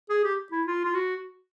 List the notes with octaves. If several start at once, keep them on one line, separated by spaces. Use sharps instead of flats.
G#4
G4
E4
F4
F4
F#4